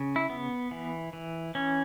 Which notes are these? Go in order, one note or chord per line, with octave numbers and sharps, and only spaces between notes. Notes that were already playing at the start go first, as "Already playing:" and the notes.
Already playing: C#3
E4
B3
E3
E3
E3 C#4